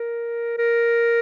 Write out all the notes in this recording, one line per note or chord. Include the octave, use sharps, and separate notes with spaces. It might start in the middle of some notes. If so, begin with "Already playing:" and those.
Already playing: A#4
A#4